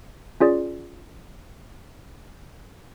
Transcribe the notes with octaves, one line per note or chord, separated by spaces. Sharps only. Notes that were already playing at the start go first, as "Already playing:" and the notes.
C#4 F4 G#4 D5